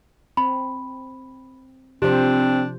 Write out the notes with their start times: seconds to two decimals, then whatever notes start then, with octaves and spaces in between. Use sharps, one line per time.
0.37 C4 B5
2.02 C3 F3 C4 D4 G4 C5